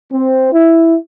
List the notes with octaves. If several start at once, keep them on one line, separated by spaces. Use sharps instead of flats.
C4
E4